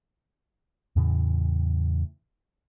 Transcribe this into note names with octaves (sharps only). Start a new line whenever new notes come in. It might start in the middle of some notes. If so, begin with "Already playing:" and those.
E2 A2 C#3 E3